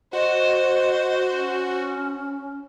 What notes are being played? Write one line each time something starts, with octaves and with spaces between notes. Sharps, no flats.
F#4 C5 D#5
C#4